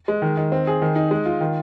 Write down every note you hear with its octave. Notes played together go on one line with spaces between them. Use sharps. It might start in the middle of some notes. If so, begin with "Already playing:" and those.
G#3
D#3
D#3
C4
G#4
D#3
D#4
G#3
F4
D#3